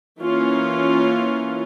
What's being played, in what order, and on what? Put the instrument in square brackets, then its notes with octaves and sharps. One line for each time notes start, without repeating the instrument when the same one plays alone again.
[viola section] E3 A#3 C#4 F4